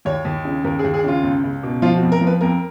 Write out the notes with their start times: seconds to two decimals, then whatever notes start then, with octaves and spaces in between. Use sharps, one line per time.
0.05 D#2 C#5
0.25 D#2
0.45 C#3
0.64 D#2 A#4
0.79 G#4
0.84 D#2
0.94 G#4
1.04 C#3 F4
1.23 C#2
1.44 C#2
1.63 B2
1.82 F3 F4
1.97 F#4
2.02 F2
2.12 A#4
2.21 F3
2.27 B4
2.41 F2 A#4